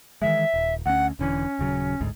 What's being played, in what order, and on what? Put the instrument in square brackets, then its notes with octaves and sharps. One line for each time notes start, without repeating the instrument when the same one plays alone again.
[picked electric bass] D#3 E3 G#3 [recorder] E5
[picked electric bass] D#1
[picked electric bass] D2 C#4 [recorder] F#5
[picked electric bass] E1 D3 E3 [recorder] C#4
[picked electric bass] D#1 C#3 F#3
A1 D2 G#2